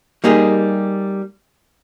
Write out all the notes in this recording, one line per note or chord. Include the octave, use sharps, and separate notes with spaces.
G3 A#3 D#4 G4 G#4